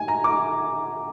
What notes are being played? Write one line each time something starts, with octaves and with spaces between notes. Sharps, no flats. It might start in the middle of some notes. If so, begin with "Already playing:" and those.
Already playing: G#5
A#5
D6